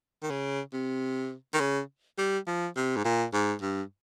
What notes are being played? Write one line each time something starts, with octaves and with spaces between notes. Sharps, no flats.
D#3
C#3
C3
D#3
C#3
G3
F3
C3
G#2
A#2
G#2
G2